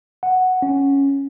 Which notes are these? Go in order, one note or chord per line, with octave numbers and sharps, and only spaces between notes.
F#5
C#4